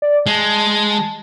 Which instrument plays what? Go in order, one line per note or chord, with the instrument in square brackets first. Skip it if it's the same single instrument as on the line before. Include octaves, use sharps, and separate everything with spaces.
[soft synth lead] D5
[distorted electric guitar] G#3 [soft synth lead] A5